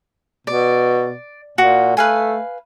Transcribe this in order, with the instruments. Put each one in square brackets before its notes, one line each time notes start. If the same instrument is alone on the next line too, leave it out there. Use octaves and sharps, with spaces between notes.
[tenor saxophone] B2 [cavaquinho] D5
[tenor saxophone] A#2 [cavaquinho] F#4
[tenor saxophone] A3 [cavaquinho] B4 F5 G#5